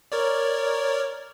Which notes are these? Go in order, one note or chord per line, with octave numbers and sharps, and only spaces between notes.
A#4 C#5 D5